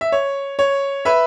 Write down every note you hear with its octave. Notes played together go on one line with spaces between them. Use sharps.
E5
C#5
C#5
B4 E5